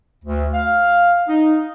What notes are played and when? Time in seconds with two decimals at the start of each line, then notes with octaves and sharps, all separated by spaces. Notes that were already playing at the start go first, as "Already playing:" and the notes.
0.25 D2
0.54 F5
1.28 D#4